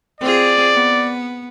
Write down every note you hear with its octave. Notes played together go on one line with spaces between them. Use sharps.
C4 F4 G#4 D5
B3